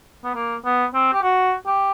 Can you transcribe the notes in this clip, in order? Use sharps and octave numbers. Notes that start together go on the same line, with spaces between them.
B3
A#3
B3
C4
G4
F#4
G4